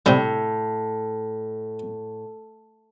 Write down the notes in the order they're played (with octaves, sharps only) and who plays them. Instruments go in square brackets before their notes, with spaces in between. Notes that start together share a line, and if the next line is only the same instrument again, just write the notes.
[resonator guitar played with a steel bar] A2 [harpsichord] C3 G3